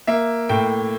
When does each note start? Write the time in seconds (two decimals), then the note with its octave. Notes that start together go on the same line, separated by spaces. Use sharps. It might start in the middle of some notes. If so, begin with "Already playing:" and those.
0.07 A#3 E5
0.49 A2 G5